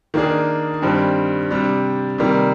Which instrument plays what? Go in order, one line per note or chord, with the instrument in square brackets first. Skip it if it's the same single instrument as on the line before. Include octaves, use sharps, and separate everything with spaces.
[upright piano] D#3 A#3 D4 G#4
G2 D#3 G3 C4
C3 G3 D4
C3 D#3 G3 A#3